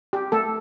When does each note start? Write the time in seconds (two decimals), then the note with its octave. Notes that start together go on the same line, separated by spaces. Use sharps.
0.13 G4
0.32 A3 A4